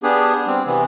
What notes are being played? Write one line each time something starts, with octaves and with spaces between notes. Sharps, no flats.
B3 D4 G4 G#4
G3 C4
C3 E3 B3